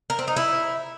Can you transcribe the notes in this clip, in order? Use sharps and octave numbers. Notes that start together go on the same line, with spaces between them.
A#4
C4
D#4
E4